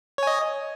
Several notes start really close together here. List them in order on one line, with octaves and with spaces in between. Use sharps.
C#5 G#5 D#5